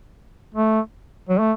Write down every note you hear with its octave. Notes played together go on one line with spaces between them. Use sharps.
A3
F#3
A3